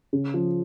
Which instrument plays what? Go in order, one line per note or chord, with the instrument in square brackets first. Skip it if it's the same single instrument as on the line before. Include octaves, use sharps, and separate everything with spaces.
[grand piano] C#3
F3